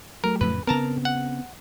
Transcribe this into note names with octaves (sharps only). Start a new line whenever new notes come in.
F#3 A3 A#4
F2 A2 C#3 B4
C#3 B3 C4 A#4 A5 A#5
F#5